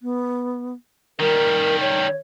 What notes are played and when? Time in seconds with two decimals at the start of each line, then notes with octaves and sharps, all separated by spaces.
0.02 B3
1.20 D#3 G3 A#4
1.81 C#5